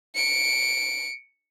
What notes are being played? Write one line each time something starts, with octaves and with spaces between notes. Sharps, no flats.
C#7 D7